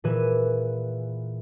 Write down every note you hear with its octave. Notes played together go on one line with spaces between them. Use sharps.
A#2 E3 G#4 B4 E5 D#7